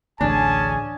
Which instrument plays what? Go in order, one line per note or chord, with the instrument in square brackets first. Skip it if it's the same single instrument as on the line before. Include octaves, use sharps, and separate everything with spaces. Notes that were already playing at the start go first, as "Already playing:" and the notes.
[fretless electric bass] A1 D2 [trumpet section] C#4 G#4 G#5 [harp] D4 [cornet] A5